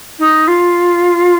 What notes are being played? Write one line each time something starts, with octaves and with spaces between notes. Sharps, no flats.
D#4
F4